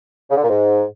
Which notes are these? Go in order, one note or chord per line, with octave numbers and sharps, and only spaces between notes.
C#3
D3
A#2
G#2